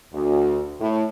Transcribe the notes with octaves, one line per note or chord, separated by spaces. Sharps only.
D2
A2